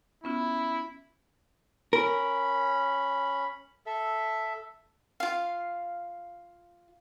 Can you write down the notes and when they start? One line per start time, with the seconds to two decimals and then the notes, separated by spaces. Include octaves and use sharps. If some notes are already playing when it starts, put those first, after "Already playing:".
0.24 B3 C#4 E4 F4
1.93 C#4 A#4 B5
3.86 A4 E5
5.20 F4 F5